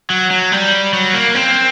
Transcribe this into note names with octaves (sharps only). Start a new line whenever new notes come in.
F#3
F#3
G3
F#3
A#3
C4